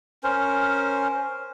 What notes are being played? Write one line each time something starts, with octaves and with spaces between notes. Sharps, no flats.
C#4 A#4 C5